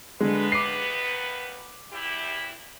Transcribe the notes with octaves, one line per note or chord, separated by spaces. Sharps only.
D#2 D3 G#3 B3 B4
D6 C7
E2 E4 G4